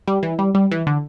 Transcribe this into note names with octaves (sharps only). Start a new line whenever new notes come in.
G3
E3
G3
G3
E3
D3